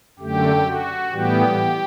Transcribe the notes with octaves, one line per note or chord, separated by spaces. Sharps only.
F#2 D3 A3 G4
F#4
A2 E3 G3 B3 G4